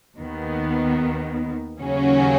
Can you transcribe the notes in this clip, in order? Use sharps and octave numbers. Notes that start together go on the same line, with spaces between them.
D#2 D#3 B3
D#2 C#3 F#3 C#4 F#4